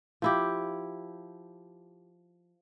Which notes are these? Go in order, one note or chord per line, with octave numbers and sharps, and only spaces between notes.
F3 E4 G4